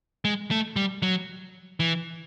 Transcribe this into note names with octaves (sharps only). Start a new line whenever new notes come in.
G#3
A3
G3
F#3
E3